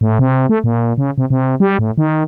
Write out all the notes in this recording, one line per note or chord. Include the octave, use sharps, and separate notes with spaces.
A2
C3
A3
A#2
C#3
C3
C3
G3
A2
D#3